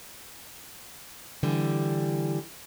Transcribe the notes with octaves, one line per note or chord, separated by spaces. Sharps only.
D3 E3 G3